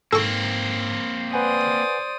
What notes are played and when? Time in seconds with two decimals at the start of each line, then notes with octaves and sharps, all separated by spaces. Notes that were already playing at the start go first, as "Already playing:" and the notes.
0.13 G#2 A#3 C4 A4 C#6
1.33 B4 C5 D5 F#5 G#5 D#6